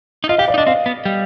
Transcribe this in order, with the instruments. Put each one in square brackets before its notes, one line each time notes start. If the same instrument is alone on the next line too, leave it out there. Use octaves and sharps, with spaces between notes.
[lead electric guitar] D#4
[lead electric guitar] F4 [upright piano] D#5
[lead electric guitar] G4 [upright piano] F5
[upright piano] D5
[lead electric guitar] D#4
[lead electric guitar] D4 [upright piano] D#5
[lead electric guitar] C4 [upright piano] F5
[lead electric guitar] B3
G3